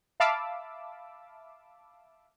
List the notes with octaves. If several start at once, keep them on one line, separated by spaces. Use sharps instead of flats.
E5 F5 A5 B5 D6 E6